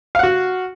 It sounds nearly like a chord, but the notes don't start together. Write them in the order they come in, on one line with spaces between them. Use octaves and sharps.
F5 F#5 F#4